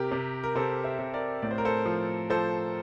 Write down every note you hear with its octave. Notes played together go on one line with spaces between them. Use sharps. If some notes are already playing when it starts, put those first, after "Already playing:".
Already playing: C3 G4 A#4
C3
A#4
C3 A4 C5
C5 E5
C3
A#4 D5
A2 D5
C5
A#4
A4 C5
F3
F3 A4 C5